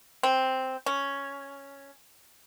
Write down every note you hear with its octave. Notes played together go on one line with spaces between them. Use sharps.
C4
C#4